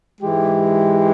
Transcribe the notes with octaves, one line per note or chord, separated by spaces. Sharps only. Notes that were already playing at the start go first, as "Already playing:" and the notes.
G#2 E3 G#3 G4